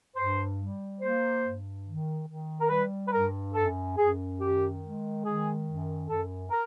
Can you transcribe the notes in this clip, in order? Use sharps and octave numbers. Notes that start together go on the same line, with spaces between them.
G2 C5
G3
A#3 C5
G2
D#3
D#3
A#4
G3 B4
B4
G2 A#4
F#2 A4
F#2 G#4
D#3 G4
G#3
D#3 G#4
F#2
F#2 A4
A#4